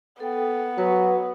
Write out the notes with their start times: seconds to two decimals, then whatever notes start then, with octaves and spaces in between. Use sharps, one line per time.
0.20 B3 A4 G5
0.78 F#3 F#4 B4